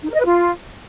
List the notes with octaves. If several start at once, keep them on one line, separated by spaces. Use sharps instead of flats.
D#4
A#4
D#5
B4
F4